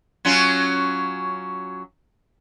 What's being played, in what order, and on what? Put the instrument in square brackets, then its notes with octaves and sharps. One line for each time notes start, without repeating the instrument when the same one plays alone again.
[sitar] F#3 C#4 F4